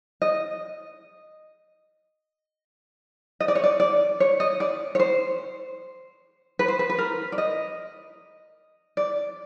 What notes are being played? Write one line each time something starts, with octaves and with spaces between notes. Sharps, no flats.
D#5
D#5
D5
C#5
D5
D5
C#5
D#5
D5
C#5
C5
B4
C5
B4
B4
A#4
D5
D#5
D5